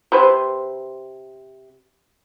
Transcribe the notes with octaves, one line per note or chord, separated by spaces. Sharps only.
C3 B4 C5